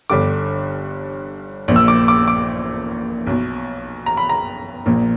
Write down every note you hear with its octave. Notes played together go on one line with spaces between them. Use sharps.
G1 G2 D3 D6
A#1 A#2
E6
D6
D6
D6
B1 B2
A#5
B5
A#5
A#1 A#2